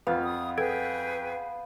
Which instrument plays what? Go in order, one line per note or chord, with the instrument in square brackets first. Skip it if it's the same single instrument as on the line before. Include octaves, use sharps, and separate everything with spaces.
[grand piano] F2 [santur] B3 F5 [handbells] B4
[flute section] D#6
[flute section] G#4 B4 G5 [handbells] A4 G#6 D7